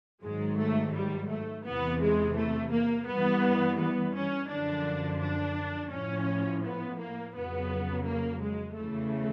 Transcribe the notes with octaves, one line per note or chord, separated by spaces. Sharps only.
G#2 D#3 F#3 G#3
A3
G3
A3
E2 C3 E3 B3
G#3
A3
A#3
G2 E3 B3
B3
C#4
F#2 D3 F3 D4
D4
A2 F3 C#4
B3
A#3
F2 C#3 F#3 B3
A#3
G#3
E2 C#3 E3 A3